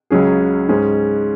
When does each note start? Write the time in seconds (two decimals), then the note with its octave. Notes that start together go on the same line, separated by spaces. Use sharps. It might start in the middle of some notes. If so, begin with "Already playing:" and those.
0.10 C#2 C#3 F#3 C#4 G#4
0.69 G#2 G#3 C#4 G#4